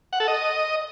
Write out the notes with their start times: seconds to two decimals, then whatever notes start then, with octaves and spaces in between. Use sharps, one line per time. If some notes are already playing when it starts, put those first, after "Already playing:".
0.13 F#5
0.20 A4
0.28 D#5